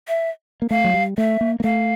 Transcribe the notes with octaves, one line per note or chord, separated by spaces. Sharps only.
E5
A#3
A3 F5
F#3
G3
A3 E5
A#3
A#3
A3 F5